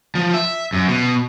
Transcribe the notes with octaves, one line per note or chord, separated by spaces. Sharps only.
F3
E5
F#2
B2